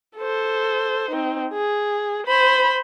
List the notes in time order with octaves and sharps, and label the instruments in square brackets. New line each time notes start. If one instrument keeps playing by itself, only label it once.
[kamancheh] A4 C5
C4 D#4
G#4
C5 B5